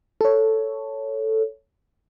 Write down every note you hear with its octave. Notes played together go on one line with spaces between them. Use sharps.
A4 C#5